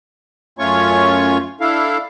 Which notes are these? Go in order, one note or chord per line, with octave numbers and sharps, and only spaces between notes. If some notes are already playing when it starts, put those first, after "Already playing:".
F#2 A3 C#4 F4 C#5 C#6
D4 E4 A4 F5